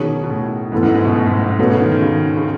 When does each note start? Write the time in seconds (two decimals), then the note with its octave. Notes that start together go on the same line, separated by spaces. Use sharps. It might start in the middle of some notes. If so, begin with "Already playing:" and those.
Already playing: B2 D#3 F#3 C#4 G#4
0.24 B2
0.29 A2
0.72 G#2 E3 B3 E4 A4
0.83 F#2
0.94 G#2
1.05 B2
1.15 A2
1.26 G#2
1.48 G#2
1.59 G#2 B2 A3 C#4 F#4 B4
1.70 C#3
1.81 D#3
1.92 D#3
2.02 C#3
2.37 C#3